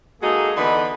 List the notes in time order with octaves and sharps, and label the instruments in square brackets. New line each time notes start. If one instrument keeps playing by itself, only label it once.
[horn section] G#3 A#3 D#4 F#4 G#4 A4
D3 E3 B3 D#4 F#5 B5